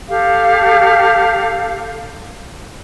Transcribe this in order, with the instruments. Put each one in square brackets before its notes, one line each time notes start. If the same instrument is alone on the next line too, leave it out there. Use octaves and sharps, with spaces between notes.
[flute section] G4 A4 F5